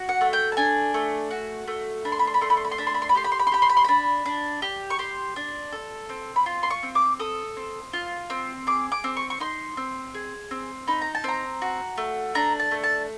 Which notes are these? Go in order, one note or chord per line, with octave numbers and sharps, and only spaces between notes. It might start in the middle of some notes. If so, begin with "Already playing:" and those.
Already playing: F#4
F#5
A3
G5
A5
D4 G#5
A3
F#4
A3
D4 B5
C6
B5
C6
B5
A3 C6
B5
C6
B5
C6
D4 B5
C6
B5
C6
B5
G4 C6
B5
C6
B5
C6
G4 B5
C6
B5
C6
D4 B5
D4
G4
C#6
G4 C6
D4
A4
C4
B5
F4 C6
C6
C#6
C4
D6
A4 D#6
C4
F4
C4
G#4 D6
D6
C4
C#6
C#6
D#4 C6
C4
G#4
C4
D#4 B5
A#5
A5
C4 A#5
F#4
A3
D4 A#5
A5
A3
A5